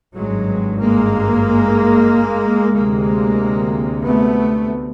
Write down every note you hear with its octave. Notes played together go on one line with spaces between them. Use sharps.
G#1 G2 F#3 G#3
G#3 A#3
D2 C3 G#3 A#3
A3 B3